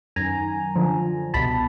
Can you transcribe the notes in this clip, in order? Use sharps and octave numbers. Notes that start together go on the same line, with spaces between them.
F#2 D#3 G#5 A#5
F#2 D3 F3
C2 B2 A5 B5